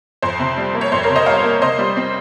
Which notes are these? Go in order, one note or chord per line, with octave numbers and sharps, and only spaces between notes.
F2 C5
C3
G3
A#3
C#5
F2 C5
A#4 C#5
C3
C5 D#5
G3 C#5 F5
A#3
C3 C5 D#5
G3
C4